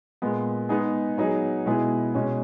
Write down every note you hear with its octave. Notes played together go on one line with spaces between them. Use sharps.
A#2 G#3 B3
G#3 B3 D#4 G#4
F#3 B3 D#4 G#4
B2 G#3 B3 E4 G#4
B2 G#3 C#4 G#4